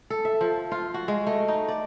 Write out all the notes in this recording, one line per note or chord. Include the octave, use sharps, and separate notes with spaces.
A4
E5
F3
F4
F#4
G#3
A3
D#4
D5